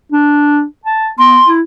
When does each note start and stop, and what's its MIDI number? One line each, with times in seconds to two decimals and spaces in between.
0.12 0.64 62
0.85 1.09 81
1.19 1.39 59
1.19 1.48 84
1.47 1.61 64